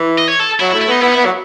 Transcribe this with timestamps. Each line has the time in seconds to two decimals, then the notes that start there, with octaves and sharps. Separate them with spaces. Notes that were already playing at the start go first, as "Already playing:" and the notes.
Already playing: E3
0.18 D#5
0.29 C#5
0.39 A4
0.60 F#3 E4
0.71 E4
0.74 A3
0.81 E4
0.88 B3 D#4
1.01 B3 E4
1.08 D#4
1.12 E4
1.16 B3
1.25 F#3